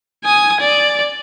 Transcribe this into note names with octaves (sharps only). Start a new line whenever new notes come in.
G#5 D#6
D5